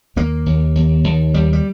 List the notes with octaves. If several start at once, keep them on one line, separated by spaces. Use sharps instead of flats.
D#2 A#3
D#2
D#2
D#2
D#2 G3
G3